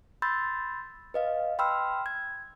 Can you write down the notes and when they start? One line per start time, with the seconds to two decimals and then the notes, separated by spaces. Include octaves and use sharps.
0.22 B5 C6 E6 G6 A6
1.14 B4 D#5 F5
1.59 G5 B5 C6 E6 F6
2.06 G#6